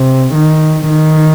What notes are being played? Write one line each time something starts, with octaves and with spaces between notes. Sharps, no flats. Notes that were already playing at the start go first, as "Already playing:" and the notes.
Already playing: C3
D#3
D#3